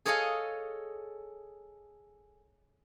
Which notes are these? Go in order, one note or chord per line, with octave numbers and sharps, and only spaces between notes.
G#4 A4 C#5 D#5 F5 G#5